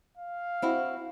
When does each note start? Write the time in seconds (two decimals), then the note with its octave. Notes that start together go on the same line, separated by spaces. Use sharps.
0.17 F5
0.62 C4 E4 F#4